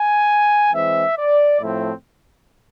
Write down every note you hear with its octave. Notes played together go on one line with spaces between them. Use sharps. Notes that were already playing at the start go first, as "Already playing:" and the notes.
Already playing: G#5
E3 G#3 C4 E5
D5
A2 F3 A3 C4 E4